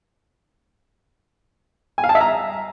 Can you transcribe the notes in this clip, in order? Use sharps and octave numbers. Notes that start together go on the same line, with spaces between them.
G#5
F5
A5
E5
A#5